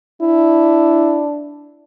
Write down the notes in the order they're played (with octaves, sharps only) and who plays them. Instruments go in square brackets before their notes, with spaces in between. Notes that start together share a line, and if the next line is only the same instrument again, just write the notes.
[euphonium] D4 [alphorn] E4